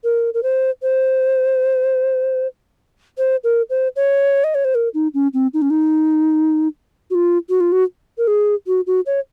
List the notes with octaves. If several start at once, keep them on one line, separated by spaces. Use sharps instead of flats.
A#4
A#4
C5
C5
C5
A#4
C5
C#5
D#5
C#5
C5
A#4
D#4
C#4
C4
D#4
C#4
D#4
F#4
F4
F#4
F4
F#4
A#4
G#4
F#4
F#4
C#5